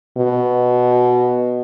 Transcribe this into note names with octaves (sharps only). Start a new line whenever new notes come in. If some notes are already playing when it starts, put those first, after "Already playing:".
B2